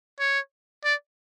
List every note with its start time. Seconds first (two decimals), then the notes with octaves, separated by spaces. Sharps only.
0.20 C#5
0.84 D5